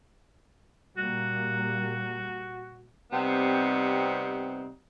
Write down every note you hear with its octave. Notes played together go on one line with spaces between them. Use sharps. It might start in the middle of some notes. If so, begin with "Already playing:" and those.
A#2 G3 A#3 F#4
C3 G3 B3 C4 D#4